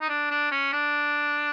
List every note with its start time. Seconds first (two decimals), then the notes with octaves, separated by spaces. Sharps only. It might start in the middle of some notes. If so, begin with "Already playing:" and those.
0.01 D#4
0.09 D4
0.31 D4
0.51 C#4
0.73 D4